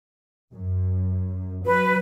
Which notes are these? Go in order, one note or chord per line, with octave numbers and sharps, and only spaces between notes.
F#2
F#3 B4